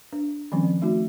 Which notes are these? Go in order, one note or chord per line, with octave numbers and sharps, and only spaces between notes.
D4
D#3 F3 G3 C4 C#4
A3 D#4 F#4